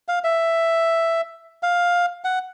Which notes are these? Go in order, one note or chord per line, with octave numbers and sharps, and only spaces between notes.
F5
E5
F5
F#5